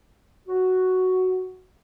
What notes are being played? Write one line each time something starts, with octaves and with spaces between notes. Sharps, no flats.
F#4